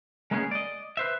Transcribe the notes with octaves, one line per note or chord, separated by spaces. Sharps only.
G#3 A#3 B3 C#4 G4 G#4
D5 D#5
B4 C5 E5